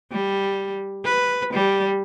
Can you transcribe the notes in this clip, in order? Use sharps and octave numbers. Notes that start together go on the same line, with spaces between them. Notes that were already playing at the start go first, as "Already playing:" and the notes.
G3
B4
G3